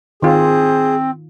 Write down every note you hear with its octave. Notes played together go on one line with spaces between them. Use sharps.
D#3 C4 F4 G#4